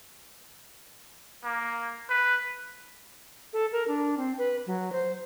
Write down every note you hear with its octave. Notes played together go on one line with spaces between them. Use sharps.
A#3
B4
A4
A#4
D4
C4
B4
F#3
C5